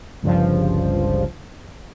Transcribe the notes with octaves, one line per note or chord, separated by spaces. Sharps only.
G1 C#2 G2 F3